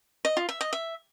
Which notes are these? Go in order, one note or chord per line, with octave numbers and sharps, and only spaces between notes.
D#5
F4
E5
D#5
E5